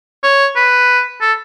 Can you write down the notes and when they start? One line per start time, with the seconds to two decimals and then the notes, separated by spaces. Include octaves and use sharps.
0.23 C#5
0.56 B4
1.21 A4